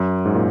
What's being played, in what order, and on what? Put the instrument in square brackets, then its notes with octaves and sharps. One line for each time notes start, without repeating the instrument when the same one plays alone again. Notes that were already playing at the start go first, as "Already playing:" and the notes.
Already playing: [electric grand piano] F#2
G#2
A#2